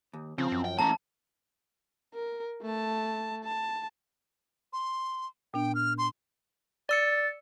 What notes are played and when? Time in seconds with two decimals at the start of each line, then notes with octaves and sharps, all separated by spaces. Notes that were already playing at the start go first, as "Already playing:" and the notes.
0.13 D#2
0.38 C#3 F3 C4
0.52 F#2
0.65 G5
0.79 E2 A2 A#3 C#4 A5 A#5
2.14 A#4
2.62 A3 A5
3.44 A5
4.73 C6
5.54 A#2 B3 D4 G5
5.75 F6
5.98 C6
6.89 D5 E6 A6 C#7